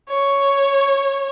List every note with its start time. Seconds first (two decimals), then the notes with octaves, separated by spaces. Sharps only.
0.09 C#5